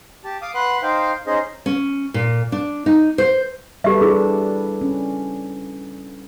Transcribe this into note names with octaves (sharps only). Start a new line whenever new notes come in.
G4 A5
F5 D6 D#6
B4 F#5 C6 F#6
D#4 C5 F5 G5
C#4 D#4 G#4 C5 D#5
C#4
A#2
D4
D#4
C5
G3 G4 A4 B4 E5
D4 E4 G#4
C#4